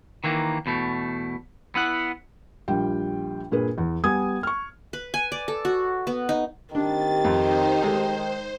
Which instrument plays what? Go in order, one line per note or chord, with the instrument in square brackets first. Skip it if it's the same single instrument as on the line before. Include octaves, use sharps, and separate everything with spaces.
[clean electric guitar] D#3 E3 A#3
E2 B2 A3
B3 E4 F#5
[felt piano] A#1 G3 F4 G5
G2 A#2 G#4 B4
E2
G3 B3 G#5 D#6 G#6
C#6 F6
[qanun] B4
G#5
D5
A4
F#4
B3
D#4
[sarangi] D#3 [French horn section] A3 C4 G4 [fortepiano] D4 [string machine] A6
[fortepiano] F2 [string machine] D#4 C5
[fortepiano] G#3 A4 G5 [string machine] C5